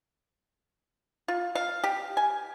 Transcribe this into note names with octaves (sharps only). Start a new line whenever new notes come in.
F4
F5
G4
G#5